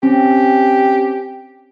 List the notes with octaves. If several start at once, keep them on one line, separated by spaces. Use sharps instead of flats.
C4 C#4 G4